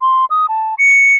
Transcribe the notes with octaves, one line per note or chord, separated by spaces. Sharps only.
C6
D#6
A5
C#7